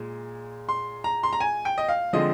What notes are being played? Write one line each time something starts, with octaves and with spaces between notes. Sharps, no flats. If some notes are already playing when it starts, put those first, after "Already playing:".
Already playing: A#2 G#3
C6
A#5
C6
A#5
G#5
G5
D#5
F5
D3 F3 G#3 C4 D#5